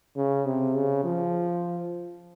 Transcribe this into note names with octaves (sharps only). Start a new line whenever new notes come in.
C#3
C3
C#3
F3